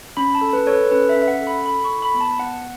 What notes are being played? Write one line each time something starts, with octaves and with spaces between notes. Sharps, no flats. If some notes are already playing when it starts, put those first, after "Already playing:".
C#4 B5
A5
A4
B4
A4 C#5
B4
C#4 B4
E5
C#4
E5
F#5
A4
B5
A4 B5
C#6
E4
B5
B3
A5
B3 F#5